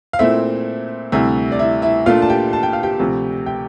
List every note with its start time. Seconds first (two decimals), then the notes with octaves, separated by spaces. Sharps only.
0.13 F5
0.19 A#2 A3 C4 E4 E5
1.12 D2 C3 G3 E4 E5
1.52 D5
1.59 E4 E5
1.82 E4 E5
2.06 A#2 A3 D4 F4 F5
2.22 A5
2.29 G4 G5
2.53 A5
2.63 G5
2.73 F5
2.83 G4 G5
2.99 D2 C3 F3
3.46 G4 G5